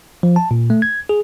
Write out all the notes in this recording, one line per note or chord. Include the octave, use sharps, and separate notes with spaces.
F3
A5
A#2
A3
G#6
G#4